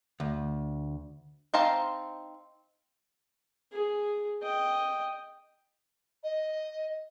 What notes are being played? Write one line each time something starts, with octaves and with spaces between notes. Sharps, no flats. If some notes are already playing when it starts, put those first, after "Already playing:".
D2
C4 D#4 C5 F5 A5
G#4
D#5 G5
D#5